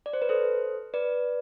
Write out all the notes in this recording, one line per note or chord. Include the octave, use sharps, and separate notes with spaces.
D5
C5
B4
A4 C5
B4 D5